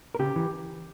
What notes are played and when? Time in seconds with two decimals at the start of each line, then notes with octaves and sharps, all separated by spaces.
0.15 A#4
0.19 C#3 G4
0.36 E3